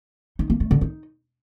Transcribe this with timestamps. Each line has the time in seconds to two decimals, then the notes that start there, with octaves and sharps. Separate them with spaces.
0.39 D#4
0.50 A#3
0.60 A3
0.71 D3
0.81 D#4